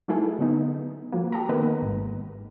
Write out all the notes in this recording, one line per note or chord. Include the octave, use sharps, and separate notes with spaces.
F#3 A3 D#4 E4 G#4 A4
D3 B3 D#4
F3 F#3 A#3
G4 A4 A#5
D#3 A#3 B3 D#4 A#4 B4
G#1 G#2